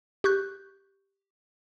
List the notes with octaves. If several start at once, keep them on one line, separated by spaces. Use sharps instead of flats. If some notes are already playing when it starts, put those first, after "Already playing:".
G4 C#6 F#6 G6